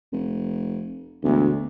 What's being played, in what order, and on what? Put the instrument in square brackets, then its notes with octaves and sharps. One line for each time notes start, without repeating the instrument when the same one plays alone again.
[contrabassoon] F1
[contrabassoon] E1 [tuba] D2